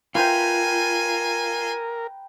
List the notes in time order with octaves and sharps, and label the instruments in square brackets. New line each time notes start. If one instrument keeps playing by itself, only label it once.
[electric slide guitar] F4 [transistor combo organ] A#4 [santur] B4 G5 A#5 [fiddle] G#5